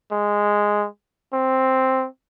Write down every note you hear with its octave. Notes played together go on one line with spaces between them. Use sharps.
G#3
C4